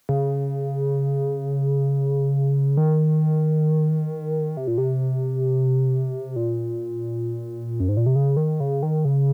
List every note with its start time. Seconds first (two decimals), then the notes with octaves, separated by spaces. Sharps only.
0.09 C#3
2.77 D#3
4.57 C3
4.68 A#2
4.78 C3
6.36 A#2
7.80 F#2
7.89 G#2
7.97 A#2
8.06 C3
8.15 C#3
8.37 D#3
8.60 C#3
8.83 D#3
9.05 C#3